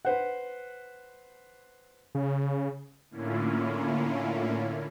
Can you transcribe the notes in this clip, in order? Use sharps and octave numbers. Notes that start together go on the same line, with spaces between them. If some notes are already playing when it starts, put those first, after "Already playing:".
B4 C5 F#5
C#3
A2 D3 A#3 C#4 E4 F4